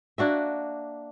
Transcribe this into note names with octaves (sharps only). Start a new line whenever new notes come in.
A#3 D4 F#4 E5